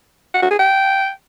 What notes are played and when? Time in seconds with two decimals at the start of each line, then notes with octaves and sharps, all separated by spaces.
0.34 F#5
0.42 F#4
0.51 G#4
0.59 G5